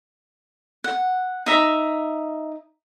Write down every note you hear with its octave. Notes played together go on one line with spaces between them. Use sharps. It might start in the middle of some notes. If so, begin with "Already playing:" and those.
F#5
D#4 E5 A#5